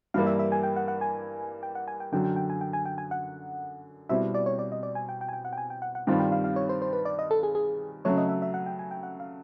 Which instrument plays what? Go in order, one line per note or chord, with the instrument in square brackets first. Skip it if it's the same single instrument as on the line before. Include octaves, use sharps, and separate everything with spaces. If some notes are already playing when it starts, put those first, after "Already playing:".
[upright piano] G2 E3 G3 A#3 [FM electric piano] F5
[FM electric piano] E5
E5
G#5
G5
F#5
F#5
G#5
G5
F#5
G#5
G5
[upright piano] F#2 D3 F#3 [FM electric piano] G5
[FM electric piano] G5
G5
G#5
G5
G#5
G5
G#5
F#5
[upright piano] B2 G3 C4 E4 [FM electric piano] E5
[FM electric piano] D5
C#5
D5
D#5
D5
G#5
G5
G5
G#5
G5
F#5
G5
G#5
G5
F#5
F#5
[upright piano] G2 D#3 G3 C4 F4 [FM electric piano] G5
[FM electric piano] G5
F5
F5
C#5
C5
C5
B4
D5
D#5
A4
G#4
G#4
[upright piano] C#3 F#3 A3 [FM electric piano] C#5
[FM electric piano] D#5
E5
E5
F#5
G5
G#5
G5
F#5
F5